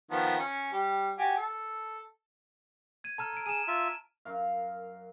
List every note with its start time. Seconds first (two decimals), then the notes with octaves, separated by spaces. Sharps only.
0.11 D#3 F3 B3
0.39 C#4
0.72 G3 G4
1.18 F#4 G4 G#5
1.37 A4
3.04 G#6 D#7
3.18 A4 A5 A#5 F6
3.33 A#5 D7
3.46 G#4 D#7 E7
3.68 F4 E5
4.25 F#2 A#4 F5